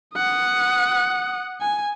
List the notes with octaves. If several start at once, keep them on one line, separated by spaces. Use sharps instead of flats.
F#5 D#6
G#5